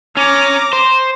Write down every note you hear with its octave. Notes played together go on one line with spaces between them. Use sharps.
C#4 A#5 D6
C5